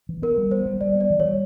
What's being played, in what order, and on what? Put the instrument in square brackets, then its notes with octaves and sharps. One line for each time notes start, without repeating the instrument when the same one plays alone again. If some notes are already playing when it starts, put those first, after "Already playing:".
[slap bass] E3
[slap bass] B3 [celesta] A#4
[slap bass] G3
[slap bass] B3 [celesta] C5
[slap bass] G3
[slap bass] G3 [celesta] D5
[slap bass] B3
[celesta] D5
[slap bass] E3
[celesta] C#5
[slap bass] G3